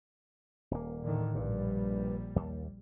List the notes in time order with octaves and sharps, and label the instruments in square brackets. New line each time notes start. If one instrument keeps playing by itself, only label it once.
[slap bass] D#1 A#3
[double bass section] A2 D3 D#3
[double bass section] A#1 G3 [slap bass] G2
[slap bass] D#2